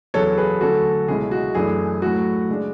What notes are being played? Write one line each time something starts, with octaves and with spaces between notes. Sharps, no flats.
E2 C#3 F#3 B3 A4 C#5
G#4 B4
D2 D3 F#3 C#4 F#4 A4
C#2 B2 G#3 C#4 E4 G#4
F#4
F#2 E3 A3 D4 G#4
A2 F#3 A3 F#4
C#3 G#3 D4